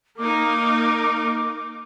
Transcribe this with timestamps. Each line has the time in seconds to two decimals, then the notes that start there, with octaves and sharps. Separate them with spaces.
0.18 A#3 D#4 A#4 D6